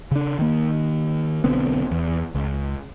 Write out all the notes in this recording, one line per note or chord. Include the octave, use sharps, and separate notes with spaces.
C#3 D4
D#3 A#3
B1 D3 B3 C4
E2
C#2